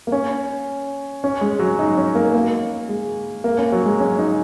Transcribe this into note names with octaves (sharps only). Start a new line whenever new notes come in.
A#3
C#4
C#4
G#3
F#3
D#4
C#4
A#3
A#3
G#3
A#3
C#4
F#3
G#3
C#4
D#4